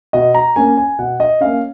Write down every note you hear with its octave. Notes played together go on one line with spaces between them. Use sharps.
B2 D#5
A#5
A#3 C#4 G#5
G#5
B2 F#5
D#5
A#3 C#4 F5